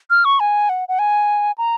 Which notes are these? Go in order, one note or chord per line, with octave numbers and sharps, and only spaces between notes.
F6
C#6
G#5
F#5
F#5
G#5
A#5